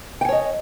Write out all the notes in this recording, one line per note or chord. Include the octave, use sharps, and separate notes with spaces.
C#5 D#5 G5 G#5